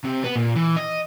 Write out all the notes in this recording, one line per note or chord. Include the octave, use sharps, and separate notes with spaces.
C3
B3
A#2
E3
D#5